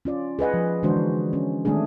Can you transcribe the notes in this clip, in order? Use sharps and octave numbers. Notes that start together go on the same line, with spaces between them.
C#4 F4 D5
G#4 B4 D#5 F#5
F3
D3 E3 G#3 D4 F#4 C5
C#4
D#3 G#3 A3 C4 D4 G#4